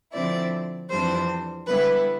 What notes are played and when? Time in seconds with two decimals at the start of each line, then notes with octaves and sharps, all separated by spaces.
0.13 D3 F3 C4 E4 D5
0.90 F2 E3 G3 D4 C5
1.67 D3 G3 B3 E4 B4